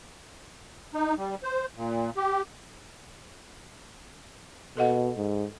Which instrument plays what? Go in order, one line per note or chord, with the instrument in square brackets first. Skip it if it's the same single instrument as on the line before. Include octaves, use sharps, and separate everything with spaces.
[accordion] D#4
G3
C5
A#2
G4
[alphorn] B2 [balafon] A4 D#5 F#5
[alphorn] G#2